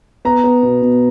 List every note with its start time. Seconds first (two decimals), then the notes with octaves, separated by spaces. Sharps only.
0.25 B3 A#5
0.44 B3
0.63 B2
0.82 B2